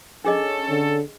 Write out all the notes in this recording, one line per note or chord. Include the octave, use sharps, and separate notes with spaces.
C#4 D4 G#4 A4 D#5
D3